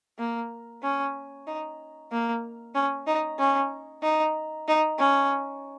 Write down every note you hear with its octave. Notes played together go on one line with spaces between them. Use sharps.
A#3
C#4
D#4
A#3
C#4
D#4
C#4
D#4
D#4
C#4